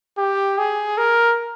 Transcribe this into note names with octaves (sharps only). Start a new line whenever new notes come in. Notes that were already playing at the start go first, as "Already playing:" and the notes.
G4
G#4
A#4